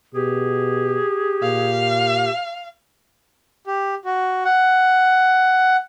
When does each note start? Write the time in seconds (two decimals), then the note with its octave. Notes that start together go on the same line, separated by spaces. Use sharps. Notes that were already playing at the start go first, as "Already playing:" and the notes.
0.14 B2 G4 G#4
1.43 A#2 F5
3.67 G4
4.05 F#4
4.45 F#5